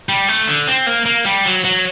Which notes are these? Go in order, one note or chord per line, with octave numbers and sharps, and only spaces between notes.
G3
A3
D3
C4
A#3
A#3
G3
F#3
F#3